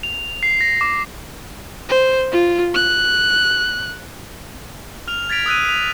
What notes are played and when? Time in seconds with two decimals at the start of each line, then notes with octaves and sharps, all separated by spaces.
0.03 F7
0.43 C7
0.61 A#6
0.81 D6
1.89 C5
2.32 F4
2.74 F#6
5.08 F6 F7
5.29 G#6 A6 B6 D7 F7
5.46 D#6 E6 F#6 B6 D#7
5.65 B6 F7